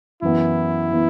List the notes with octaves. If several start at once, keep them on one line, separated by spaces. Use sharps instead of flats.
F#2 E3 B3 E4
E3 B3